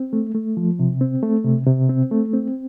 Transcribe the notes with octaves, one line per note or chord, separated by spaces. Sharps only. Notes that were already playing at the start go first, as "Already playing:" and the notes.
Already playing: C4
A3
A3
F3
C3
C4
A3
C3
C3
C4
A3
C4